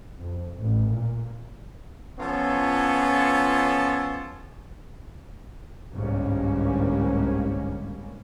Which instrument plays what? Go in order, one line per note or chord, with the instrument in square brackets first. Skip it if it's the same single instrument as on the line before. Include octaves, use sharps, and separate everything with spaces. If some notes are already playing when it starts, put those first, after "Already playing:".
[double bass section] F2
A1
A#2
[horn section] F3 B3 C#4 F4 A4 C#5
[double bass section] G1 C2 G#2 G3 A#3 C#4